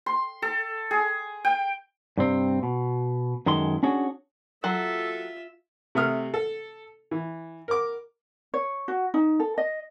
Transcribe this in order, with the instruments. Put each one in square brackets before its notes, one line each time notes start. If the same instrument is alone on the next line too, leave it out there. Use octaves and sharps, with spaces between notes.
[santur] C6
A4
G#4
G5
[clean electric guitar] G2 C3 C4
B2
F#2 D#3 G#3 A4 C6
C#4 D4 F#4 G#4 C#5
[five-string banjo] F#3 [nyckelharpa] F4 E5 [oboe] A4
[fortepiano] C3 A3 E5 D#6 F6
A4
E3
A#4 D6
[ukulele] C#5
F#4
D#4
A4
D#5